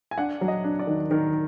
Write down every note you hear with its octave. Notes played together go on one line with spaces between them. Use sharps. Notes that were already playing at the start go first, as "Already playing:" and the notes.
G#5
D4 F#5
F#3
D#5
D4
D5
D#3
D#3 A#4